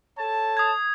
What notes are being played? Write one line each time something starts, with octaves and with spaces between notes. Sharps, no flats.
A4 C#5 A5
D#6 G#6